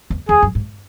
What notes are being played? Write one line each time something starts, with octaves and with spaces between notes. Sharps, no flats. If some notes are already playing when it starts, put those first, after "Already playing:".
E2
E2 G#4
F#2
G#2